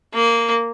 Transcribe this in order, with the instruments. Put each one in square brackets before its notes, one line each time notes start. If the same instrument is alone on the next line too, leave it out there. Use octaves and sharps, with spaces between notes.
[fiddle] A#3